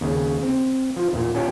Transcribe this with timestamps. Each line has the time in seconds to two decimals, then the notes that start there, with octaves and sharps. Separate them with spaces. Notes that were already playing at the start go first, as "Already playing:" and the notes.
0.01 D#2 C#3
0.43 C4
0.96 F3 F4
1.13 E2 A#2
1.35 C#4 D4 F4 G4 C#5 G5